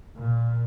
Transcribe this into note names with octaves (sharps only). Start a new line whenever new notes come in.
A#2